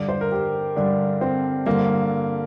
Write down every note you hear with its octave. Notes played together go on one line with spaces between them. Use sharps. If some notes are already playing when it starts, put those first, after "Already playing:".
Already playing: G2 D3 D5
C5
A#4
G4
G2 D3 D4
C4
G2 D3 A#3